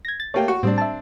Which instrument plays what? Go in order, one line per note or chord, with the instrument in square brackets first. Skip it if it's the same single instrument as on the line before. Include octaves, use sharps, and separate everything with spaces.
[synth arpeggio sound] G#6 A#6
A6
[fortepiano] A3 A#3 G5 [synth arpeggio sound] G4 C#5
[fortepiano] F#4 [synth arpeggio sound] C#6
[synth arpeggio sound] A2 G3 [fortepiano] C4 D4
[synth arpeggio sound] E5 A5